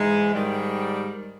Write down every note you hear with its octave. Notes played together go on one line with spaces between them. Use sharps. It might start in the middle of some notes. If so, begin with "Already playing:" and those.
Already playing: G#2 E3 G#3 D#4
G#2 D#3 G3